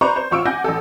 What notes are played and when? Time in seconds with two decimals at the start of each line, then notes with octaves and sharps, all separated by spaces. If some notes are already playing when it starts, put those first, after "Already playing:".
0.01 B4 C5 D5 A#5 C#6
0.16 C5
0.31 A1 F4 C#6 E6 D7
0.46 F#5 G#5 D6 G6 A#6
0.64 A1 A4